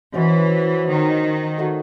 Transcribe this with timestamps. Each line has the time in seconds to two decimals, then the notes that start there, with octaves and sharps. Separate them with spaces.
0.14 E3 C#4 F#4 C5 D#5
0.87 D#3
1.58 A3 D#4 F#4